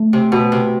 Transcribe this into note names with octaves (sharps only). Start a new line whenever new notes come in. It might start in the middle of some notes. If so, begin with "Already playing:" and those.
Already playing: A3
C3
B2
C3